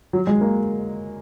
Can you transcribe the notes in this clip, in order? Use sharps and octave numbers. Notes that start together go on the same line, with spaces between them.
F#3
G#3
A#3